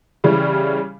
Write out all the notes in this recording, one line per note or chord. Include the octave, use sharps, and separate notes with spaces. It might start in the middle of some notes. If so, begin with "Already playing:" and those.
C#3 E3 G3